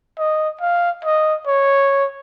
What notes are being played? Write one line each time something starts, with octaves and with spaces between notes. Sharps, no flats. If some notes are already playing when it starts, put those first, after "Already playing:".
D#5
F5
D#5
C#5